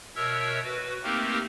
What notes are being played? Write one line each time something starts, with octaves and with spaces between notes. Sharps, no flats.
B2 A#4 C#5 E5 E6
F#4 B4
A3 A#3 C4 D#4 G4 A#4